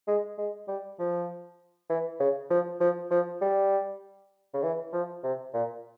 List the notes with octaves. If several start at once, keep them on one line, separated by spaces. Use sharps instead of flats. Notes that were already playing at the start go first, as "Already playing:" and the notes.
G#3
G#3
G3
F3
E3
C#3
F3
F3
F3
G3
C#3
E3
F3
C3
A#2